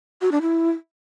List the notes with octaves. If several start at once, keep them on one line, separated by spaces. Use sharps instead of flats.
F#4
D4
E4